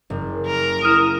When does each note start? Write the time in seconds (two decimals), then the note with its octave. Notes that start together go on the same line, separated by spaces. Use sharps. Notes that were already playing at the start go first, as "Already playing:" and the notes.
0.10 F#1
0.46 A#4
0.82 E4 D#6 F6 E7